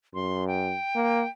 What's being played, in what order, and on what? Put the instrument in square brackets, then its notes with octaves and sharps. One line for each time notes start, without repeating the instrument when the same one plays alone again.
[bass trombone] F#2 [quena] C6
[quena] G5
[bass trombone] A#3